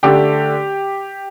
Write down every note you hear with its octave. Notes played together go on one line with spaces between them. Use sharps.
D3 A3 D4 G4